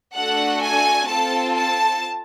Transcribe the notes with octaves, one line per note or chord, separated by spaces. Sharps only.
A3 D4 F#4 A4 F#5
G#5
C4 F4 A4 A5
A5